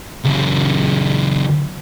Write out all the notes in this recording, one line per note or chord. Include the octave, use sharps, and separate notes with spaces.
C#2 F#2